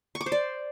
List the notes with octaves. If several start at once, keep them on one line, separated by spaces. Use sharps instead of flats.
C#6
D6
C5
D5